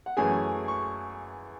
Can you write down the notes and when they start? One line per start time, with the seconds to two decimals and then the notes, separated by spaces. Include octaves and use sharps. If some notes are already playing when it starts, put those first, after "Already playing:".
0.06 F#5
0.17 F#2 E3 A3 C#4 G#4 G#5
0.68 C#6